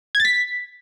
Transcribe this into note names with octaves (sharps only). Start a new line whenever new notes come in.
G#6
A6
B6